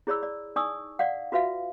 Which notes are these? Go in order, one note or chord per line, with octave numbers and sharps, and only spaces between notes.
E4 G#4 C#5 D5 B5 E6
D5
D#4 D5 G#5 C#6 D#6 E6
D5 F5 F#5
F4 F#4 B4 E5 F5